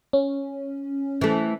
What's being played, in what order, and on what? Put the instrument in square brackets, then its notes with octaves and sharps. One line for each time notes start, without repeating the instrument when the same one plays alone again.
[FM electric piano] C#4
[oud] E3 A3